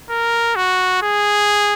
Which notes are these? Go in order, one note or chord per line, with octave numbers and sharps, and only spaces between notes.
A#4
F#4
G#4